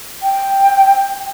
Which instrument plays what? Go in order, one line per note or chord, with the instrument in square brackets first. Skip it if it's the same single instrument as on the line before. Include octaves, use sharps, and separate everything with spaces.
[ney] G5